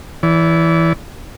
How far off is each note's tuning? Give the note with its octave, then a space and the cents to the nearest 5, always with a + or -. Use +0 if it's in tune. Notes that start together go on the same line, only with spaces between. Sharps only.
E3 +0 D5 -35